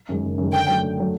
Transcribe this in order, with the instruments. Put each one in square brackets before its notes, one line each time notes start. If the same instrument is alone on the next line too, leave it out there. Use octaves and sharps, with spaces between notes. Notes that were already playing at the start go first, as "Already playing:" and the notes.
[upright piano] F#2 D#3 G#3
F#1
F#2 D#3 G#3
[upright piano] D3 [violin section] G5
[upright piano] F#3 A3
D3
F#3 A3